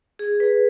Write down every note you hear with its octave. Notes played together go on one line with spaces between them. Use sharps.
G#4
B4